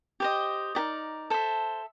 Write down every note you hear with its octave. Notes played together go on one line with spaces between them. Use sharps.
G4 C5 D#5
D#4 G4 A#4 D5
A4 C5 E5